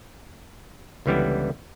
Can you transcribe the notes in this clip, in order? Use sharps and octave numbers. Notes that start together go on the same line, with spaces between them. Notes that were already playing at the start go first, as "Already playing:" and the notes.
C#2 D3 E3 G3 B3 E4